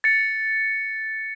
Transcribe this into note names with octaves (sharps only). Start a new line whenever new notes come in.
A6 C#7